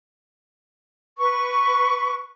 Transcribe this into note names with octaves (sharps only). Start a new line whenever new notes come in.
B4 C#6